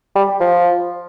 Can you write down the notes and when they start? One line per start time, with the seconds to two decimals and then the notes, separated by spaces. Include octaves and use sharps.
0.15 G3
0.40 F3